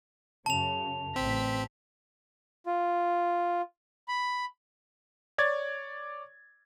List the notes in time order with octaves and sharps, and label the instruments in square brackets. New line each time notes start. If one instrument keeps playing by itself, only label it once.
[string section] F#2 C#3 [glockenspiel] A5 F7
[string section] A1 B6 [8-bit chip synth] C4
[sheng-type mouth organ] F4
B5
[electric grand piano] C#5 D5 G#6 A6